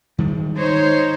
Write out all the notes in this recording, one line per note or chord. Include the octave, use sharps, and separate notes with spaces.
D#3 G3 G#3
D#4 C5 C#5